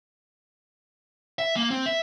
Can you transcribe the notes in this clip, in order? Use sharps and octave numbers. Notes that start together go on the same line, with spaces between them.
E5
A#3
C4
E5